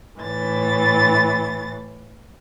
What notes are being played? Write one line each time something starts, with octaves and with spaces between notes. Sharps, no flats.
A2 E3 A6